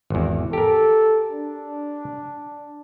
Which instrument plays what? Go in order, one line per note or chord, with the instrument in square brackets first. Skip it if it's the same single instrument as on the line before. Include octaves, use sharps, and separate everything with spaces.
[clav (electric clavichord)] G#1 E2
[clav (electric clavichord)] G4 A#4 [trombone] A4
[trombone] D4